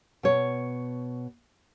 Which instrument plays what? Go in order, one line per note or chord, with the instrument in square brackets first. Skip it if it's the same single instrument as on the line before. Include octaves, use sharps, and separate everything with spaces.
[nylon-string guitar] B2 C#5